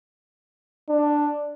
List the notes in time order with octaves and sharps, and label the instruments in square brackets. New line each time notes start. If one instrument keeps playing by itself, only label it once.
[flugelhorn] D4